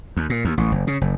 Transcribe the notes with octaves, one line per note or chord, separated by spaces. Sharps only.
D#2
A#2
D#2
A1
F#1
C#3
F#1